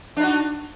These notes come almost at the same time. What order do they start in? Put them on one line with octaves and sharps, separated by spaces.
D4 D#4 F#4